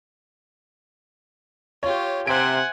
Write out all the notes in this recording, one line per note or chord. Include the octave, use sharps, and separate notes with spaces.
F4 G4 C#5
C3 C5 E5 F#5 G#5 D7